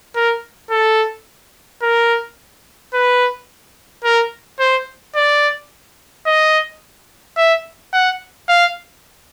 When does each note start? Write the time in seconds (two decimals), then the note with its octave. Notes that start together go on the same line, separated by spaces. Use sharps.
0.16 A#4
0.71 A4
1.82 A#4
2.94 B4
4.04 A#4
4.60 C5
5.16 D5
6.26 D#5
7.37 E5
7.93 F#5
8.49 F5